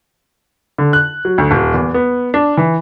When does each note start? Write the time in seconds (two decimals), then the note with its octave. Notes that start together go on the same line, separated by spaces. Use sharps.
0.78 D3
0.93 F#6
1.25 F#3
1.38 D2
1.51 D#1
1.74 E2
1.94 B3
2.34 D4
2.57 E3